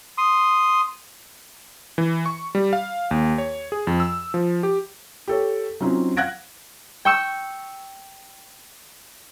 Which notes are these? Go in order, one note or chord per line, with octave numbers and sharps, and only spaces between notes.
C6 D#6
E3
C#6
G3
F5
D#2
C#5
G#4
F2
E6
F3
G4
G4 A4 C#5
F#3 C4 C#4 D#4 F4
F5 F#5 F#6 G#6 A#6 D7
G5 C#6 E6